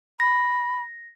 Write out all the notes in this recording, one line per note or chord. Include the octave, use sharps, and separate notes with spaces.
B5 A#6